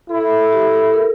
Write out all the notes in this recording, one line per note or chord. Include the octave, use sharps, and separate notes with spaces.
E4 A4
A4
A4
A4
G4
A4
A4
A4
A#4